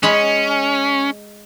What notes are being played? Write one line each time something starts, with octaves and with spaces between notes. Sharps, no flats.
G#3 C#4 B5 C6